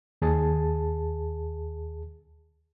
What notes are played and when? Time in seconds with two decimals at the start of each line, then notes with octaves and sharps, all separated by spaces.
0.22 D#2 G#4 A5